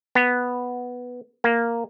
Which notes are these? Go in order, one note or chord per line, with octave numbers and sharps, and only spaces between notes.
B3
A#3